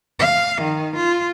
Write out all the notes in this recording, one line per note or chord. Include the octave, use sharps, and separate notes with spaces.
F5
D#3
F4